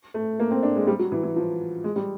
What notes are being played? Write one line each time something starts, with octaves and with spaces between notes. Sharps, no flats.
A3
A#3
C4
D4
G#3
G3
F#3
E3
E3
F3
G#3
G3